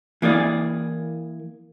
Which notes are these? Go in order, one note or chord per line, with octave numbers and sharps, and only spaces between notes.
E3 A#3 G#4 D5